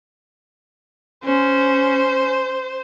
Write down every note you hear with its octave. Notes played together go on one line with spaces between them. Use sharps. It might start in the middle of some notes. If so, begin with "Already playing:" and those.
C#4 C5